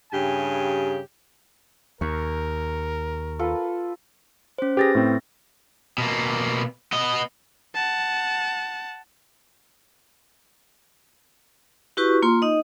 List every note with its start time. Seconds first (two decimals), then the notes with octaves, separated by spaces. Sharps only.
0.13 G2 C#3 G4 G#5
2.01 D#2 A#4 C#6
3.39 F4 A4 B4
4.58 C#4 C5
4.77 G4 G#4 B4 A6 A#6
4.95 A2 C4
5.98 B2 A#3
6.92 B3 D#5
7.75 F#5 A5
11.97 E4 F#4 G4 B4 C#6
12.22 A#3 F4 C6
12.42 D#4 D#5